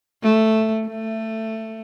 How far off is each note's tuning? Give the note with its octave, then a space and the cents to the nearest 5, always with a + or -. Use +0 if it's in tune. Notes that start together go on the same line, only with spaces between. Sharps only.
A3 +0
A3 +15